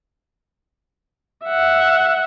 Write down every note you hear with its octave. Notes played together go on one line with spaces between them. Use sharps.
E5 F#5